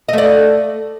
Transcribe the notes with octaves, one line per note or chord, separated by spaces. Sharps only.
A3 D5 D#5